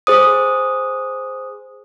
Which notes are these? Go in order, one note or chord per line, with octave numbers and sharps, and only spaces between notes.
G#4 C5 D#6